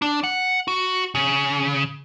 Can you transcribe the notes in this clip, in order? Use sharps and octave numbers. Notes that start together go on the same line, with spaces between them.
D4
F#5
F#4
C#3